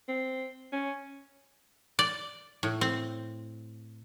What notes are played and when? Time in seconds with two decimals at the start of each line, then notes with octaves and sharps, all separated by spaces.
0.08 C4
0.72 C#4
1.99 D5
2.63 A2
2.81 C4